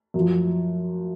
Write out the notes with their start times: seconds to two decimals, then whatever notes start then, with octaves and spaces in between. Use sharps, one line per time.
0.14 F#2
0.19 F3